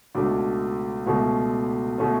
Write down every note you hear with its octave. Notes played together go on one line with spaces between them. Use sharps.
C#2 B2 A3 C#4 D4 F#4
C#2 B2 A3 C#4
B2 A3 C#4